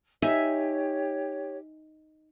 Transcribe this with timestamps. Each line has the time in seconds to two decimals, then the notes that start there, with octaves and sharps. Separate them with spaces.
0.22 D#4 G4 C#5 E5 G#5